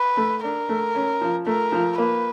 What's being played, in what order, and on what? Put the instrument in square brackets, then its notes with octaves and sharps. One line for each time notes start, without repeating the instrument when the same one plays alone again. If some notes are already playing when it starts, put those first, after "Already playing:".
Already playing: [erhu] B4
[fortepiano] A3
[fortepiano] D4 [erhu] A#4
[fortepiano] A3
C#4
F3
[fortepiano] A3 [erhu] A#4
[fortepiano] F3
[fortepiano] A#3 [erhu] B4